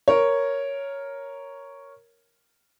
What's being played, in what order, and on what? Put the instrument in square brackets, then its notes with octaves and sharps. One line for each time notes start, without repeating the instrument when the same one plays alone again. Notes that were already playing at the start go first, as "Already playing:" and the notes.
[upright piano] A#4 C#5